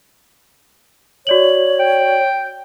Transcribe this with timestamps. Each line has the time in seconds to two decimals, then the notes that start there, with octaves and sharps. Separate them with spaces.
1.27 F#4 C#5 D5 F#7
1.79 G5